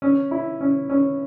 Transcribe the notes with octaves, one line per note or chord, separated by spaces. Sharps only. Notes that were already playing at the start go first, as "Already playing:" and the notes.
C#4
E4
C#4
C#4